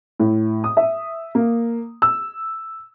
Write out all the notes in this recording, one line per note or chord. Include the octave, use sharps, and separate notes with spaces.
A2
D#6
E5
A#3
E6